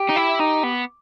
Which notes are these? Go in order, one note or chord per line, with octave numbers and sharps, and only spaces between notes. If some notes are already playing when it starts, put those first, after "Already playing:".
Already playing: G4
D#4
E4
D#4
B3